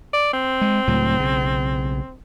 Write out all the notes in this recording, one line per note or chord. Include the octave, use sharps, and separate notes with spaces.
D5
C4
G#3
C#2 A2 F#3
B1 C#3